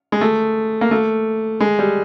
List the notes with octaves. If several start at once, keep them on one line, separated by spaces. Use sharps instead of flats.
G#3
A3
A#3
A3
G#3
G3